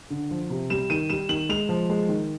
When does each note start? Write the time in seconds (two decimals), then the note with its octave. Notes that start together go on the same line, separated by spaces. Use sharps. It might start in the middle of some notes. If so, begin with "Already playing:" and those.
0.10 D3
0.31 F3
0.50 C3
0.70 G3 E7
0.90 D#3 D#7
1.10 G3 E7
1.29 D#3 F#7
1.49 G#3 F7
1.69 F3
1.90 G#3
2.09 D#3